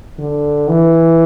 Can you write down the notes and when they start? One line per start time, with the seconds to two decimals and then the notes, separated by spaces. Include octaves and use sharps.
0.19 D3
0.68 E3